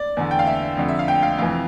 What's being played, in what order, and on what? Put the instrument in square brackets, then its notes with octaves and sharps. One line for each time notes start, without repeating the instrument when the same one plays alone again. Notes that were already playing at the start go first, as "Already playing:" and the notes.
Already playing: [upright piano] D5
E2 D3
G5
F5
E5
F2 D3
E5
F5
G5
F5
F2 C3 E3 F5